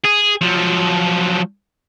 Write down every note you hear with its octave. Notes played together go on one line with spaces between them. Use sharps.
G#4
F3 F#3